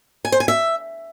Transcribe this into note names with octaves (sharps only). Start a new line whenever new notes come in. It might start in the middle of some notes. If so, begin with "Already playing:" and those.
G#5
C5
G#5
E5